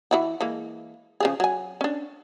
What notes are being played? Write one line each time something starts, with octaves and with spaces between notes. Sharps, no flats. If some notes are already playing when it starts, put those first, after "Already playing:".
E3 E4 F#4
E3 G#3 A#3
C#3 F3 G#4
F#3 G#5
C#4 D4